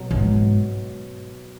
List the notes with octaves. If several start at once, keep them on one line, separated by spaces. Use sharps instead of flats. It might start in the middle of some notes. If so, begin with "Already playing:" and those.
Already playing: B2 F#3
G#2